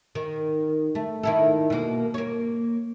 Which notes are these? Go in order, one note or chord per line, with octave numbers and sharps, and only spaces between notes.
D#3
A3
D#3 E4 A4
B2 A#3
A#3 C#5